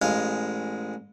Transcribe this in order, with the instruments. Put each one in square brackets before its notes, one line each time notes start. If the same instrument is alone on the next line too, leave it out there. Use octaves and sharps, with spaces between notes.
[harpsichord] A1 G#3 D#5 F5